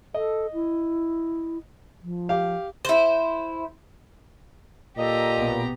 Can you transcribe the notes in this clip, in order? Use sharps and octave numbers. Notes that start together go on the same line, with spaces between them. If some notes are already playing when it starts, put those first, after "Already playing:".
A4 D#5
E4
F3
G4 F5
E4 C5
A#2 G4 A4 D#5 A#5
A#1 B2 B3